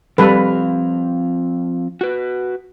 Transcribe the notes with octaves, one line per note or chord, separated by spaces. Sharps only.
F3 G3 C4 A4 B4 F5
F#4 B4